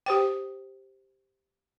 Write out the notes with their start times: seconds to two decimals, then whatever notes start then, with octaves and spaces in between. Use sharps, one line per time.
0.06 G4 C5 G5